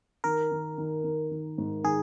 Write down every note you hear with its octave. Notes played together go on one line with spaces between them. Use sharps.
D#3 A#4
D#3
D#3
D#3
D#3
G#2
D#3 G#4